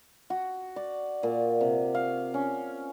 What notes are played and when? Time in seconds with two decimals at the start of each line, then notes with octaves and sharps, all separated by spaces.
0.30 F#4
0.76 D5
1.23 A#2
1.61 C3
1.95 F5
2.34 C#4